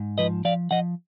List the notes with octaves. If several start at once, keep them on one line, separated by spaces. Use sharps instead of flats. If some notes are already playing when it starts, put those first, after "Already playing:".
Already playing: G#2
F3 B4 D#5
F3 D5 F5
F3 D#5 F#5